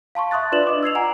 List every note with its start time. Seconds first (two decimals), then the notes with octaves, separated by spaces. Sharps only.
0.15 F5 A5 C6 C#6
0.31 E5 C6 D#6 F#6 A6
0.52 D4 F4 B4 D5 E7 F#7
0.67 D#5 D6
0.83 E6 G#6 C7 F7
0.95 F#5 G#5 A#5